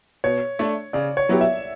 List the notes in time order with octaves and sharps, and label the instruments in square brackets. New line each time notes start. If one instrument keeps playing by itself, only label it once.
[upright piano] B2 [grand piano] C#5
[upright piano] A3 D4
[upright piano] C#3 [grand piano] D5
[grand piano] C#5
[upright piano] F#3 B3 E4 G4
[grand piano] E5